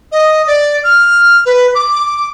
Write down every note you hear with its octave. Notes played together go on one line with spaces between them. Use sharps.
D#5
D5
F6
B4
D6